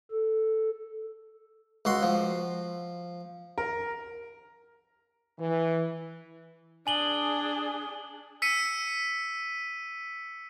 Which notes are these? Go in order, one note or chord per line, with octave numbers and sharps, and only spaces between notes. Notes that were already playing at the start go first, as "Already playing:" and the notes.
A4
C#2 F#4 C6
F3
A#4
E3
D4 G#4 G#5 F#7 G7
E6 B6 C#7 D#7